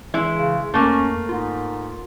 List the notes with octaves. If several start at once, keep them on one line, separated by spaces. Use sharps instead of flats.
E3 G#3 E4
C#3
F2 A3 A#3 C#4
G#2 F4